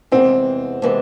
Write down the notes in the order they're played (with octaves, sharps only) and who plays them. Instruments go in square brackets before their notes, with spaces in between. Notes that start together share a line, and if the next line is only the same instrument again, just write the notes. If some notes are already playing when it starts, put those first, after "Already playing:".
[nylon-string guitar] E2 C3 E3 G#3 B3 [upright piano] C4
[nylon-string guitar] C3 E3 G#3 B3